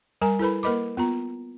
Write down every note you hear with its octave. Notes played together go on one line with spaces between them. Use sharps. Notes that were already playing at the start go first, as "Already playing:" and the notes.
G3 A#4 G#5 A#5
E4 A4 B4 B5
A#3 A#4 B4 D#5 B5 D6
B3 F4 A#5